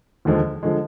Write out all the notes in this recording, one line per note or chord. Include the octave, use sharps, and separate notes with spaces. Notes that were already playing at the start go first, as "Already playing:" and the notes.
D#2 D3 F3 G#3
D3 F3 G#3